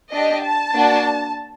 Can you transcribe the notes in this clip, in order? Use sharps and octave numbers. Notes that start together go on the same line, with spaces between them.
D4 G4 D#5
A5
A#3 D4 F#4